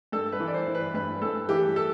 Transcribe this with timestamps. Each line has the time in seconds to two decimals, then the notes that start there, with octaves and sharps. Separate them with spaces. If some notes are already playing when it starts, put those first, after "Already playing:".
0.12 G2 A4
0.32 B4
0.40 E3
0.48 D5
0.54 C5
0.67 E3
0.75 B4
0.94 G2 B4
1.22 G2 A4
1.49 E3 G4
1.76 A4